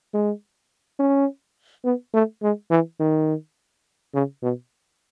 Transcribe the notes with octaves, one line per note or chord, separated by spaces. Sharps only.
G#3
C#4
B3
A3
G#3
E3
D#3
C#3
B2